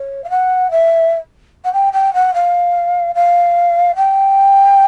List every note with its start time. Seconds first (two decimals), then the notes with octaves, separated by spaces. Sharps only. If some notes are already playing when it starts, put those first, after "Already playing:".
Already playing: C#5
0.24 F5
0.29 F#5
0.70 E5
1.64 F#5
1.73 G5
1.93 G5
2.13 F#5
2.34 F5
3.15 F5
3.95 G5